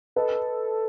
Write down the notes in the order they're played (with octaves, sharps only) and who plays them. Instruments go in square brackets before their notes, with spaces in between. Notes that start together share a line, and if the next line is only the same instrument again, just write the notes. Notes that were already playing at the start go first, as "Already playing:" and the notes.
[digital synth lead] A4 [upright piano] B4 D#5